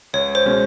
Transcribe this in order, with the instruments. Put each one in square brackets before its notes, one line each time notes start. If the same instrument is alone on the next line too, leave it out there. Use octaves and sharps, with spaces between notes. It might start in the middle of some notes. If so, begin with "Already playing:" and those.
[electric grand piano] C#2 [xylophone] C#5
[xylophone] C5
[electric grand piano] B2 G#3 C#4